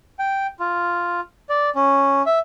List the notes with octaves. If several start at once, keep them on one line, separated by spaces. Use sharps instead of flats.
G5
F4
D5
C#4
E5